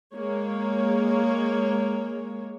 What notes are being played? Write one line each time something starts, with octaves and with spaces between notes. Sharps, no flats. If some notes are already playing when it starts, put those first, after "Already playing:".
G#3 A#3 C#5